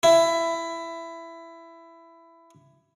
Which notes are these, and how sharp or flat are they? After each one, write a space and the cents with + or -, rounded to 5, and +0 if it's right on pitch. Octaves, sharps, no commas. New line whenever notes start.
E4 +15